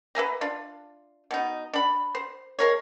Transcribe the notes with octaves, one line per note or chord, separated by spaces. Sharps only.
B4 E5 G#5 A#5
D4 F4
B2 D#4
D4 B5
C5
G#3 A#4 C#5